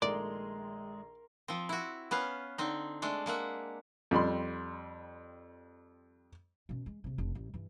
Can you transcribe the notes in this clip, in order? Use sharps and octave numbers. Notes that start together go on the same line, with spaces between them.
A#1 D#3 G#3 A3 A#4 D5 A#5 C6
F3 C4
E4 F#4
B3 C#4 B4 F5
D3 C4 D#4
G#3 A3 D4
G#3 A#3 E5 F#5
F2 G3 B5 C6
F#2 B2
G#3
A#1 C3
F1 D4
A1
G2 E3